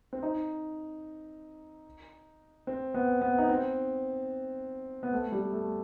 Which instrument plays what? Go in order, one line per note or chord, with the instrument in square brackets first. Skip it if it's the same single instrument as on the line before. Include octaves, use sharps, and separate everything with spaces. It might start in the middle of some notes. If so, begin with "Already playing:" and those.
[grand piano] C4
D#4
C4
B3
B3
D#4
C4
B3
A3
G3
A3